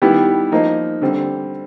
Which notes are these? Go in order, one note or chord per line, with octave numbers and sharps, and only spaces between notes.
D#3 G3 B3 E4 G4
F3 A#3 D#4
D3 G3 C4